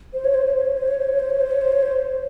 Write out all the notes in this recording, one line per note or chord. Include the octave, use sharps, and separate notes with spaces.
C5
C#5
C5
C#5
C5
C#5
C5
C#5
C5
C#5
C5
C#5
C5
C#5
C5
C#5
C5